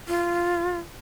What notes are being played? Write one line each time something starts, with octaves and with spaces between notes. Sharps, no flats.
F4